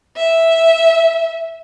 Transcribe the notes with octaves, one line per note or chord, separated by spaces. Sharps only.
E5